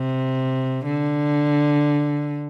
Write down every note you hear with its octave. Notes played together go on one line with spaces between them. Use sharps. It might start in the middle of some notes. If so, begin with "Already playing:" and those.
Already playing: C3
D3